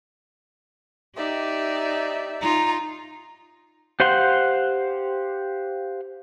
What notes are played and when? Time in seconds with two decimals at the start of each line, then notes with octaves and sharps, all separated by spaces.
1.16 D#4 G4 D5 E5
2.41 D#4 F4 A#5
4.00 G4 C5 F5 F#5 C6